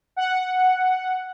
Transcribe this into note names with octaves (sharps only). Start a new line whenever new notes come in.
F#5